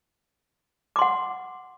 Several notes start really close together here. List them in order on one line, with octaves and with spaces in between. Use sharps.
D6 C6 F#5